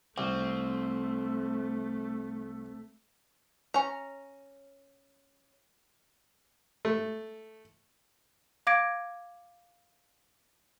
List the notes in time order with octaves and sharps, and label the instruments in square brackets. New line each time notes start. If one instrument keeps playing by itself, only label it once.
[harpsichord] C2 [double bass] A3 [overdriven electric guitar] C4
[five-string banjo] C#4 A#5
[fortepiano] A3
[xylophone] F5 D6 G#6 A#6 D7